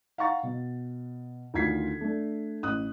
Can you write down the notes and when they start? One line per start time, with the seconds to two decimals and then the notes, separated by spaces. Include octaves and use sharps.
0.18 F5 F#5 A#5 C#6 A6
0.43 B2
1.54 D2 D#3 F4 G#6 B6 C7
2.01 A3 D4
2.63 A1 D#6 F#6